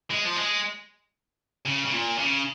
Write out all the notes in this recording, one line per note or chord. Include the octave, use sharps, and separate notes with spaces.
G#3
F3
G#3
C#3
C#3
A#2
C#3